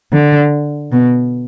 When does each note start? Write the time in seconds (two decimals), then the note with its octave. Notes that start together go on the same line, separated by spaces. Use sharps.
0.13 D3
0.92 B2